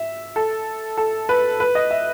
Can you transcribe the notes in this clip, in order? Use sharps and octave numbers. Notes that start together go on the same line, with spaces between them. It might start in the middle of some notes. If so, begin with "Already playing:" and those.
Already playing: E5
A4
A4
B4
B4
D#5
E5